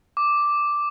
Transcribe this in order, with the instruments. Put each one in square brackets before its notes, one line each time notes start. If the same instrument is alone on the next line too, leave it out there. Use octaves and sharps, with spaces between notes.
[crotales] D6